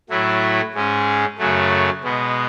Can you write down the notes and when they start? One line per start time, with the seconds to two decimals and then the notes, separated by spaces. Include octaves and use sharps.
0.10 A2 F#3 A3 E4
0.74 G#2 G#3 C#4
1.38 F#2 C#3 F#3 A3
2.03 B2 G#3 B3